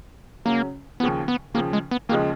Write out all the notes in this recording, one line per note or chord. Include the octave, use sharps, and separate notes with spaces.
C#3 F#3 A#3 C#4
D#2 C#3 F3 B3
B3
D#2 C#3 F3 A#3
G#3
B3
D#2 C#3 F3 G#3 A#3